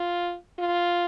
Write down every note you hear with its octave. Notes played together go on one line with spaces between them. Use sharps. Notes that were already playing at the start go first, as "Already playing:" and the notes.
Already playing: F4
F4